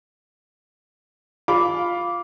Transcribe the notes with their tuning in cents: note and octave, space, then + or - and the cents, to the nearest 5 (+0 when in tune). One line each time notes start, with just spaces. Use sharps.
F4 +0 B5 +0 D6 -15